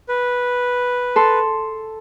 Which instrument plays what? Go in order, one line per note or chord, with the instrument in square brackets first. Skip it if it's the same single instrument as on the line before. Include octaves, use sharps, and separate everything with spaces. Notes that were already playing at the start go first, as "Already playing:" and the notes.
[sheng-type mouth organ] B4
[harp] A4 A5 C6